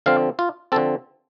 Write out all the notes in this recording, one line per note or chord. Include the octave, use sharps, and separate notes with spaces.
D3 F3 C4 F5
F4
D3 F3 C4 A4